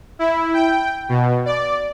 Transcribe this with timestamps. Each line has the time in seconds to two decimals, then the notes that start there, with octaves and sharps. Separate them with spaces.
0.19 E4
0.54 G5
1.09 B2
1.46 D5